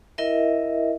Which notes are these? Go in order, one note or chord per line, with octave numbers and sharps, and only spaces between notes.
E4 A#4 D#5 E5